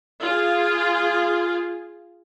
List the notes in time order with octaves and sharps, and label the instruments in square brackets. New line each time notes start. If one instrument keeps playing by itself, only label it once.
[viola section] F4 G#4